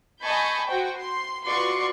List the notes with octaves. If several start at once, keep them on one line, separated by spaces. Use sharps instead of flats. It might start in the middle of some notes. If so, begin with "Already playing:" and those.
D#5 G#5 A5 B5 C#6 G6
F#4 C5 G5
C6
F4 F#4 B4 D5 C6 C#6